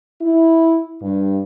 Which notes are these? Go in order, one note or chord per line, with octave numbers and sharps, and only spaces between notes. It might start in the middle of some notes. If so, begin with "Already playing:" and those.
E4
G2